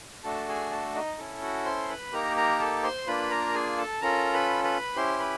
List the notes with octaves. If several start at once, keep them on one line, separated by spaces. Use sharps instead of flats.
A3 D4 F#4 A4 A5
G#4 G#5
A4 A5
D#4 D#5
C#4 E4 A4
F#4 F#5
C5 C6
B4 B5
A#3 D#4 G4 A#4 A#5
A#4 A#5
A4 A5
C5 C6
A#3 D4 F4 B4 B5
A#4 A#5
G#4 G#5
A4 A5
C#4 F4 A4 A#4 A#5
B4 B5
B4 B5
C#4 E4 G4 C5 C6
B4 B5